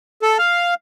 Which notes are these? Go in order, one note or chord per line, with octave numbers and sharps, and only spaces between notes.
A4
F5